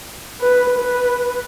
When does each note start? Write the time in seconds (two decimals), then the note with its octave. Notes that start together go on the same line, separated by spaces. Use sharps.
0.41 B4
0.79 B4